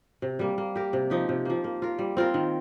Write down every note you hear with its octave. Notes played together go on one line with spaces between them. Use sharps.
C3
G3 A#3
A#3
G4 A#4
C3
F3 D#4 G4
C3
F3 A#3
A#3
F4 A#4
G3
C4 F4 A#4
D#3